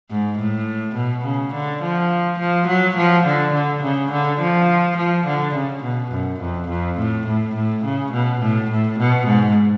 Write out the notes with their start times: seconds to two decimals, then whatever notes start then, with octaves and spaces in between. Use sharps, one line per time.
0.11 G#2
0.38 A2
0.96 B2
1.25 C#3
1.54 D3
1.82 F3
2.39 F3
2.68 F#3
2.97 F3
3.26 D3
3.54 D3
3.83 C#3
4.12 D3
4.41 F3
4.97 F3
5.26 D3
5.55 C#3
5.84 B2
6.12 F#2
6.41 F2
6.69 F2
6.98 A2
7.27 A2
7.56 A2
7.84 C#3
8.13 B2
8.41 A2
8.71 A2
8.99 B2
9.27 G#2